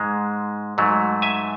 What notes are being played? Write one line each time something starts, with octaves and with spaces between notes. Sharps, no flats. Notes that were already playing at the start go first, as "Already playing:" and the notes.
Already playing: G#2 G#3
G#2 F#3 A3
E5 G#5